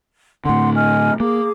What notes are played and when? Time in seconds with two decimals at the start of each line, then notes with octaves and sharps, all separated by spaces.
0.45 A2 D3 F#5 C6
0.75 D#5 G#5 F6
1.20 A#3 G#4 D6